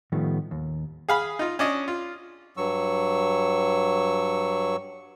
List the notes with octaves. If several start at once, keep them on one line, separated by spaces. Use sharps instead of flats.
A2 D#3 F3 G3 A3 B3
D#2
G#4 F5 B5
D#4 F4
C#4 D4 D#5
F4
G2 F#3 C#6 E6